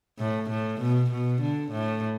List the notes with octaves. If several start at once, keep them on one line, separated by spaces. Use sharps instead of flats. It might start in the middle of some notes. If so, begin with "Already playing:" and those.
A2
A2
B2
B2
D3
A2